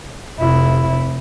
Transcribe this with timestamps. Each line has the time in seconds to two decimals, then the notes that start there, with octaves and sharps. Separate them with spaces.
0.40 F1 E4